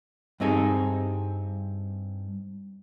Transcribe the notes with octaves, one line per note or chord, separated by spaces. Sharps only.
G2 C4 D#4 G#4 A4